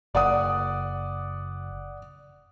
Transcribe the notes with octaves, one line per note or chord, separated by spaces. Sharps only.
F#1 D5 F#5 D#6